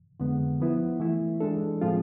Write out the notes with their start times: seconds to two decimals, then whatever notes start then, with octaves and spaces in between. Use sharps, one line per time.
0.20 F2 D3 G#3 B3
0.60 F3 B3 E4
1.00 E3 A3 E4
1.40 E3 G#3 D4 A4
1.81 A2 F3 G#3 C4 F4